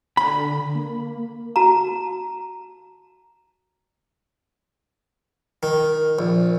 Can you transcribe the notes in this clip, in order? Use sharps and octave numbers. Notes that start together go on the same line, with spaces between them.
D3 B5
A#3
F#4 A5 A#5
D#3
A#1